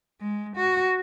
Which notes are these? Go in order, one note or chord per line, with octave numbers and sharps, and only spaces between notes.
G#3
F#4